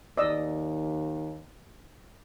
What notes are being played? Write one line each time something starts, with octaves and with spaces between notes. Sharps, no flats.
D#2 D5 D#5 E6